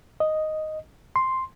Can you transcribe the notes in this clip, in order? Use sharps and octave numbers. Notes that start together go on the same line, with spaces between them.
D#5
C6